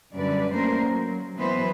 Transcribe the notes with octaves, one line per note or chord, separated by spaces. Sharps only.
F#2 D3 G3 B4 D5
A3 A#3 C#4 A#4 C5
F#3
E3 F#3 B3 B4 C5